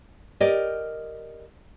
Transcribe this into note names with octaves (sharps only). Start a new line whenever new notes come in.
G4 A#4 D5 D#5